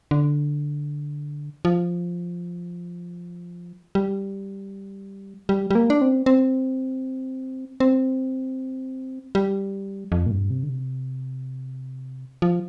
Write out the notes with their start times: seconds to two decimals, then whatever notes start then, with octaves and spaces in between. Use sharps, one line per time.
0.11 D3
1.65 F3
3.95 G3
5.49 G3
5.71 G3
5.75 A#3
5.90 D4
6.01 C4
6.26 C4
7.80 C4
9.35 G3
10.12 F2
10.26 A#2
10.31 G2
10.50 C3
10.63 D3
10.69 C3
12.42 F3